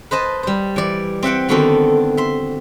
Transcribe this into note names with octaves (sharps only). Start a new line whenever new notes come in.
B4 C5 D#5 A5
G3 C5
E3 D5
C4 E5 F#5 G5
D3 D#3 B3 C4 F#4 A4
E5 C6